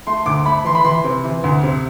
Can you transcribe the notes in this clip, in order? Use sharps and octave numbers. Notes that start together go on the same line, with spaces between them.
A3 C6
D2 D6
A3 B5
E3 C6
B5
E3 C6
C3
E3
D2
C3